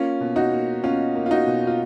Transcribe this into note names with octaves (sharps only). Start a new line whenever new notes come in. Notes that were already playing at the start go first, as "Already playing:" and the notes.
Already playing: A#3 C#4 F4
B2
D#4 F#4
A#3
B2 C#4 F4
A#3
F4
D#4 F#4
B2
F4